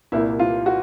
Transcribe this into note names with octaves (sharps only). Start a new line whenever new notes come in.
C2 A#2 G3 A#3 E4
F4
F#4